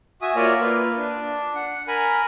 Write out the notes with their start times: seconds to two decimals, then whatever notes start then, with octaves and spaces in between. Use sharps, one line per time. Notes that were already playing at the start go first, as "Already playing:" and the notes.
0.22 F#4 E5 G#5 D#6
0.36 A#3 F4 A#4 C#5 D5 E5
0.61 A#3 F4 B4
0.97 D4
1.55 F#5
1.88 A#4 G#5 B5